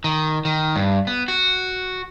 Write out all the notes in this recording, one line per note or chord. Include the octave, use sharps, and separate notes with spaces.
D#3
D#3
G2
B3
F#4